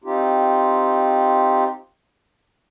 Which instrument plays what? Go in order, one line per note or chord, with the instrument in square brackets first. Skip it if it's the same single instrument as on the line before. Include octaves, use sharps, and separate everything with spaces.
[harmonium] C4 D#4 F4 G4